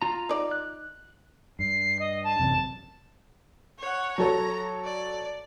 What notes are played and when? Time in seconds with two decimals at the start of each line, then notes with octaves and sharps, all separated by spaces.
0.02 F4 A#5
0.29 D#4 D5
0.51 F#6
1.59 G2 C7
1.99 D#5
2.24 A5
2.40 A1 F#2 C3
3.79 C#5 F#5
4.18 F#3 A4 C#5 A#5
4.84 D5